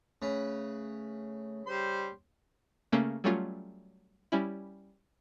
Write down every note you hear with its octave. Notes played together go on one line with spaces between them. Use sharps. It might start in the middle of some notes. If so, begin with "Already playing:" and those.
C#3 A3 B4
G3 C5 C6
C#3 A3 A#3 C#4
F#3 G3 A3 C#4 F4
G3 C#4 E4